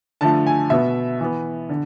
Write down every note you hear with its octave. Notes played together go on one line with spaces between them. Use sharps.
D3 F3 A3 A5
G#5
B2 B3 E5
E3 B3
D3